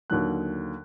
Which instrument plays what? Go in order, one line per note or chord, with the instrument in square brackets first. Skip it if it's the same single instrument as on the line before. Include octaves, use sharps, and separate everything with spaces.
[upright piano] D#2 D3 F#3 F#6